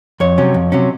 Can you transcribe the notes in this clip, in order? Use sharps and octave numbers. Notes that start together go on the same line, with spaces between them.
F2 C#5
C3 F#3 C#4
F2
C3 F#3 C#4